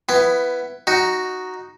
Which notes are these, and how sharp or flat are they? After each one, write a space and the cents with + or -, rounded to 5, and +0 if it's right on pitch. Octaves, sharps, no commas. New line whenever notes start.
B3 +5 E4 +20
D#4 +0 F#4 +0